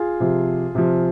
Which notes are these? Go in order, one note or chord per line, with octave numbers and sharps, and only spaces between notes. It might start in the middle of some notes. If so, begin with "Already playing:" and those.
Already playing: F4 G#4
C3 F3
C3 F3